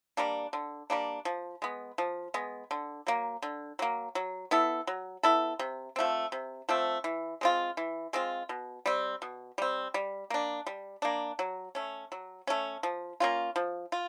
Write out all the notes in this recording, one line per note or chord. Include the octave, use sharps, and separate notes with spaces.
G3 A#3 D4
D3
G3 A#3 D4
F3
G#3 B3
F3
G#3 B3
D3
F#3 A#3
D3
F#3 A#3
F#3
B3 E4 A4
F#3
B3 E4 A4
C3
F3 A3 C4
C3
F3 A3 C4
E3
G#3 C4 F4
E3
G#3 C4 F4
B2
G3 C4
B2
G3 C4
G3
A#3 D4
G3
A#3 D4
F#3
A3 C#4
F#3
A3 C#4
F3
A#3 C#4 F4
F3
F4